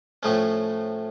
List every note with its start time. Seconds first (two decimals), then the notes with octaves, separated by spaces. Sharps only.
0.23 A2 F3 A3 C#4